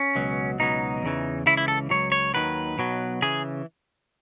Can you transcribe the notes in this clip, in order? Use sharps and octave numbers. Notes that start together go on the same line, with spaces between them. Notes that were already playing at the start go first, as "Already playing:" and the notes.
Already playing: C#4
C#2 B2 F#3
C#2 B2 F#3 D#4
E2 C#3 E3
C#2 C#3 E3 E4
E4
A4
C#2 C#3 F#3 C#5
C#5
D#2 D#3 F#3 B4
B1 B2 F#3
C#3 E3 G#4